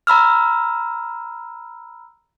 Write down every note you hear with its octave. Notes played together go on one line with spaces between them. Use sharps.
A#5 B5 E6 F6